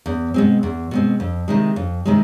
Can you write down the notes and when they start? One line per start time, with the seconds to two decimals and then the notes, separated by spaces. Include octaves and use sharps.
0.06 E2
0.34 B2 G#3 C4
0.63 E2
0.91 B2 G#3 C4
1.20 F2
1.48 C3 D#3 G#3
1.76 F2
2.06 C3 D#3 G#3